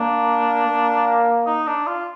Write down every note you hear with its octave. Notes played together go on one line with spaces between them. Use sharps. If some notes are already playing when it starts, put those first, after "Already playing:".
Already playing: A#3 D4
A#3
D#4
D4
F4